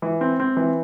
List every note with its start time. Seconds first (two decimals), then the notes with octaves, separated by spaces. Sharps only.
0.02 E3
0.21 C4
0.40 C4
0.57 E3